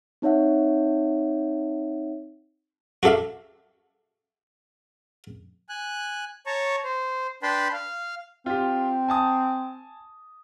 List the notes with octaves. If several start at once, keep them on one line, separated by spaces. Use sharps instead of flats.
C4 D#4 C#5 E5 F#5
F#4 G4 A4 E5 F5
G#5 F#6
C#5 A5 A#5 C#6
C5
D4 B4 G5 A5 B5 C6
F5
C4 F4 G4
G#5 A5 D#6